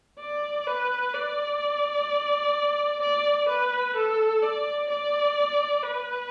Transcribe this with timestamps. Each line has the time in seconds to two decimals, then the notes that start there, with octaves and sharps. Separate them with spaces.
0.20 D5
0.67 B4
1.14 D5
3.02 D5
3.49 B4
3.96 A4
4.43 D5
4.89 D5
5.83 B4